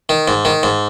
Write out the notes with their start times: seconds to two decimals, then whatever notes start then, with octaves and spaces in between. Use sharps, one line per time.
0.09 D#3
0.28 G#2
0.45 D#3
0.63 G#2